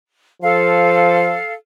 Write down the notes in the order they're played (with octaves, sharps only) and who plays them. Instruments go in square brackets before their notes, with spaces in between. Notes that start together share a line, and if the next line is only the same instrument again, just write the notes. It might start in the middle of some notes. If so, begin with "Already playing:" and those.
[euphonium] F3 [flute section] A4 F5